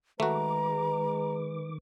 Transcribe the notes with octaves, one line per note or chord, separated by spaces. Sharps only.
D#3 G#3 A3 F#4 B4 A#5 D6